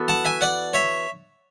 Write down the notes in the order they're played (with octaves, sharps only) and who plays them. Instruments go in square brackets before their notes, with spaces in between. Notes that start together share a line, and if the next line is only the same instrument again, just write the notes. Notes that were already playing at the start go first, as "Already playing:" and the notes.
Already playing: [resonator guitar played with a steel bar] E3 B3 F#4 A4
[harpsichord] F#5 A5
E5 G#5
D5 F#5
C#5 E5